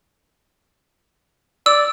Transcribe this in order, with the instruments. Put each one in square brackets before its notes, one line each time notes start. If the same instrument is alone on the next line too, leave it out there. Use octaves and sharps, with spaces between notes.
[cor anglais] D5 [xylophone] E6